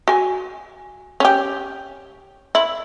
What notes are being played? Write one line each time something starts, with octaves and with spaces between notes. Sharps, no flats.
F#4 G#5
C#4 G4
E4